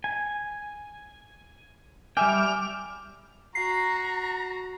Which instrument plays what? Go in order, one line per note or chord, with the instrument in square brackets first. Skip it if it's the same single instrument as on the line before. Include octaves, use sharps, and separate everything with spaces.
[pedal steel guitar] G#5
[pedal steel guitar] G3 E5 G5 [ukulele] G#5 [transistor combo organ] D6 F6
[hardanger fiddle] F#4 [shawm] A#5 [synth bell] C7